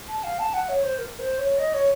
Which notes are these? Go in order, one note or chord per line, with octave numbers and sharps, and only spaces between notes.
A5
F5
A5
F#5
C#5
C5
A#4
C5
C#5
D#5
C#5